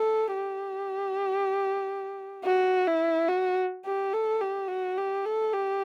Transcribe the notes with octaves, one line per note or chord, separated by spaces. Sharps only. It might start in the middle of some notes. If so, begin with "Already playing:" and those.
Already playing: A4
G4
F#4
E4
F#4
G4
A4
G4
F#4
G4
A4
G4